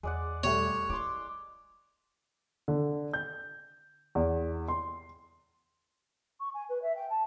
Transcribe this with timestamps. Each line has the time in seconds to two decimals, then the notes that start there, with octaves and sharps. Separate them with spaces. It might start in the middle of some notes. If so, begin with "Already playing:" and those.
0.03 E2 G#3 D5 F#5
0.44 B2 G3 A3 C#5
0.90 E4 C6 D6
2.68 D3
3.14 G6
4.15 E2
4.68 C6
6.40 C#6
6.54 G#5
6.69 B4
6.82 E5
6.96 G5
7.10 A5